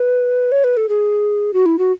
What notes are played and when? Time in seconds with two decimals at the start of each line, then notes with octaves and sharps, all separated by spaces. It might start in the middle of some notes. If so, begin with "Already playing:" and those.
Already playing: B4
0.52 C#5
0.64 B4
0.77 A4
0.89 G#4
1.53 F#4
1.66 E4
1.79 F#4